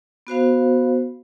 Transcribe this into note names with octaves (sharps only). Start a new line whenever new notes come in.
B3 F#4 C5 F5